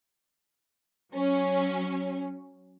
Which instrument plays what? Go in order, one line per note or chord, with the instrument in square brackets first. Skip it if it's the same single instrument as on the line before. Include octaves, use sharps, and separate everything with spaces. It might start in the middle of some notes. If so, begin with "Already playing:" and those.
[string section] F#3 C#4